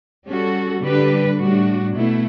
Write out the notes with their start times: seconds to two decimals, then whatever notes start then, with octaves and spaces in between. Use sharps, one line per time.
0.26 G3 C#4 F#4 A4
0.82 D3 G3 D4 G4 B4
1.38 A2 G3 D4 F#4
1.94 B2 A3 E4